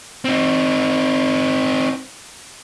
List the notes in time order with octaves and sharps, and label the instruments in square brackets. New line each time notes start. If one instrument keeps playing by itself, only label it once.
[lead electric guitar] C4 D#4